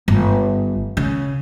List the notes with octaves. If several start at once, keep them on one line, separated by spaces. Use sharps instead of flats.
G1
C#3